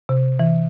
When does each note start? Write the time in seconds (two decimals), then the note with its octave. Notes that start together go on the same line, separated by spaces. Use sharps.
0.09 C3
0.39 E3